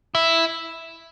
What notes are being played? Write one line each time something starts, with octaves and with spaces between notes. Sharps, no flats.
E4